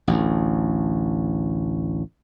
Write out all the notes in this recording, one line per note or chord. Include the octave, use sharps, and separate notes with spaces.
A1 D2